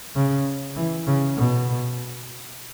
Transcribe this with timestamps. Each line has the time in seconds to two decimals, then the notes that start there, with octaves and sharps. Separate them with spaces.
0.15 C#3
0.76 E3
1.06 C#3
1.36 B2